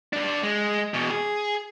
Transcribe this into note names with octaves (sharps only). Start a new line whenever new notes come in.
G2 D4
G#3
E2 B2
G#4